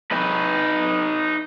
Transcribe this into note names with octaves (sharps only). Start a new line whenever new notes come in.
D#4 B4